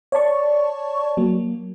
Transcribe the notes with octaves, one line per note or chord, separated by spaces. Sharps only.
C#5 D5 A5 C#6
F#3 A#3